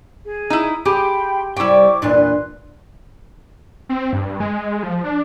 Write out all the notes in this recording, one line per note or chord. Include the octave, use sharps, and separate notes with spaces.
G#4
D#4 E4
G4 G#4 G5 B5 C6
C3 G3 E4 G5 C#6 D6
E2 A#2 D4 B4 C6 F#6
C4
G2
G#3
F3
D4